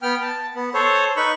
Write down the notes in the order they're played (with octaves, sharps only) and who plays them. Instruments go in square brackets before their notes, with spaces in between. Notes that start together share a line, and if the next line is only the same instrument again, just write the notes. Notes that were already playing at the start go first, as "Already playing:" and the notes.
[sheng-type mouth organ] B3 G5 F6
A5
B3
A4 C5 C#5
D#4 B4 B5 C#6